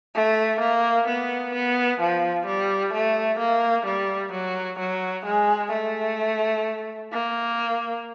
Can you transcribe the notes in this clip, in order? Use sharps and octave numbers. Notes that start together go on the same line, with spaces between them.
A3
A#3
B3
B3
F3
G3
A3
A#3
G3
F#3
F#3
G#3
A3
A#3